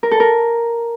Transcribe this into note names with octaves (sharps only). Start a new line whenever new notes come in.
A#4
A4
A#4